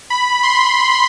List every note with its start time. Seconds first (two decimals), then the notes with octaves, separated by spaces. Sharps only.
0.10 B5
0.43 C6